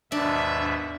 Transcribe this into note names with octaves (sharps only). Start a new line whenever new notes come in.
D#2 G#2 B2 D4 E5